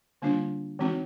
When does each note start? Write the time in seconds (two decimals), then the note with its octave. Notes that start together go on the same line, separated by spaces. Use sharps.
0.22 D3 G3 A#3 D4 F4
0.79 E3 G#3 C4 D#4 F#4